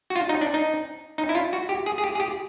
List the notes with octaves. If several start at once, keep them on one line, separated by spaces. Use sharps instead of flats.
F#4
F4
D#4
D4
D#4
D#4
E4
F4
F#4
G4
G#4
G#4
G4
G#4
G4